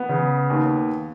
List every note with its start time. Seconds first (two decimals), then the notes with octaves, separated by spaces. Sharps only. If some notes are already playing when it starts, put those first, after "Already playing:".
Already playing: B3
0.09 C#3
0.50 D#2